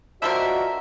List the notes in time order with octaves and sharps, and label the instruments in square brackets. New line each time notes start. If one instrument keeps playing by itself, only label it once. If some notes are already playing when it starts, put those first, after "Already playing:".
[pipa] D3 F3 A#4 [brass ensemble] F4 F#4 D#5 [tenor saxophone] E5